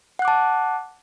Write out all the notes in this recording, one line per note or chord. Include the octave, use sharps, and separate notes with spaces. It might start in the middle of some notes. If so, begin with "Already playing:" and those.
F#5 A5 D6 F#6